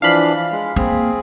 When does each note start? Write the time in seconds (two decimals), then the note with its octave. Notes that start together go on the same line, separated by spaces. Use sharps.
0.02 E3 F3 D4 F5 B5
0.52 G#3
0.76 A#3 C4 G#4